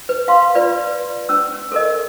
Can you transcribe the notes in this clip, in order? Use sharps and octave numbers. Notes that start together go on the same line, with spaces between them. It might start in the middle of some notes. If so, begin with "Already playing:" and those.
B4
F5 C6
F4 B4 D5
C#4 E6
A4 A#4 D#5